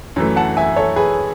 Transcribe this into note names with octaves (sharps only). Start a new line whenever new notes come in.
F#2 E3 A3
F#5 A5
E5 G#5
A4 C#5
G#4 B4